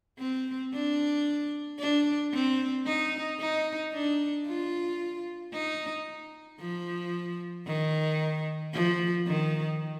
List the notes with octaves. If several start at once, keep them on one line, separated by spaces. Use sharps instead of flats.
C4
D4
D4
C4
D#4
D#4
D4
F4
D#4
F3
D#3
F3
D#3